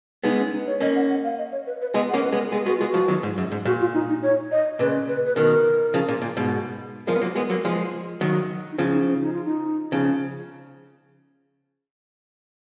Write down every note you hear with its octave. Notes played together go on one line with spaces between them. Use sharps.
G#3 B3 D#4
C#4
D#4
C#5
A#3 C#4 D#5
F#5
F#5
F5
D#5
C#5
B4
B4
G#3 B3 D#5
F#5
A#3 C#4
C#5
B4
G#3 B3
A#4
G#3 B3 G#4
G#3 B3 F#4
G#3 B3 F4
F#4
F3 G#3
D#3 F#3
G#2
F#2
G#2
A#2 F#4
F4
D#4
D#4
C#5
D#5
A#2 C#3 B4
B4
B4
B2 D#3 A#4
C#3 F3
A#2
A#2
G#2 B2
F3 G#3 A#4
B3
F#3 A#3
G#3 B3
F#3 A#3
F3 G#3
D#3 F#3
D#4
C#3 F3 F4
D#4
C#4
D#4
F4
D#4
C#3 F3